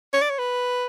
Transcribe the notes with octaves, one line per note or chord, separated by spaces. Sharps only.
C#5
D5
C#5
B4